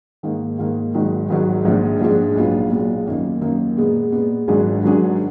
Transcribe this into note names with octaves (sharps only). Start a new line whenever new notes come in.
G#2 D#3 A#3
G#2 D#3 A#3
G#1 G#2 D#3 F#3
G#1 G#2 D#3 F#3
A#1 G#2 F3 G#3 D4
A#1 G#2 F3 G#3 D4
B1 A#2 G#3 B3 F4
B1 A#2 G#3 B3 F4
F#2 D#3 A#3 D#4
F#2 D#3 A#3 D#4
A#2 G#3 B3
A#2 G#3 B3
G#1 G#2 F#3 D4 G#4
G#1 G#2 F#3 D4 G#4